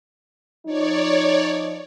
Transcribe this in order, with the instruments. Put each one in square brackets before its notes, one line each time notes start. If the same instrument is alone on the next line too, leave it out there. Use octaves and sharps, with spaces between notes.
[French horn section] F3 D#4 [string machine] C#5 D5